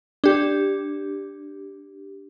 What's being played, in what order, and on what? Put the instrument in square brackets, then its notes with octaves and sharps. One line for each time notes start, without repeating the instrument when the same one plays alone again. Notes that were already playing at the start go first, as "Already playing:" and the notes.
[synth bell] D4 G4